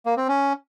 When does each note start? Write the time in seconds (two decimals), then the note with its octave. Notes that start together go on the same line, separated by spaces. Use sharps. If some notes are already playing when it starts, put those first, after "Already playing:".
0.06 A#3
0.17 C4
0.28 C#4